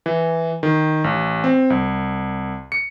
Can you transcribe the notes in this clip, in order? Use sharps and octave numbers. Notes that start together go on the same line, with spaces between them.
E3
D#3
A1
C4
C2
C#7